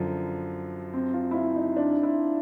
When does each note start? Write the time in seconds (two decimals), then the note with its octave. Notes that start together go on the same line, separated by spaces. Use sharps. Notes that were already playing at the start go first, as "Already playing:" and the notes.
Already playing: F#2 D3 F3
0.93 C4
1.14 F4
1.31 E4
1.35 F4
1.56 D#4
1.76 D4
2.03 E4